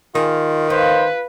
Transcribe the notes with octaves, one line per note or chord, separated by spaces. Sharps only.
D#3 F4 G#4
F4 B4 C5